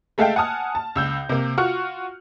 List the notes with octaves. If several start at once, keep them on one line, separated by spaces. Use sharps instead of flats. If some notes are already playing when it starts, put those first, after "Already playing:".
G#3 A3 A4 E5 F5 G5
F#5 G#5 A5 D#6 F6
A5
C#2 E6 G6
C3 A#3
F4 F#4 C#6 F6 F#6 C#7